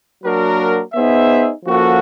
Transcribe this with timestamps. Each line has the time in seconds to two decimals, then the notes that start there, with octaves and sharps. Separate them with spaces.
0.24 F#3 A#3 D4 F#4 A#4
0.94 B3 D#4 G#4 C5 E5
1.64 F3 A#3 C#4 F#4 A4